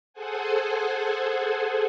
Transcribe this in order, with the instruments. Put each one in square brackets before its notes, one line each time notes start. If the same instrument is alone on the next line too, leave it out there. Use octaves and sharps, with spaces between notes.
[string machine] G#4 A4 C5 F#5 G#5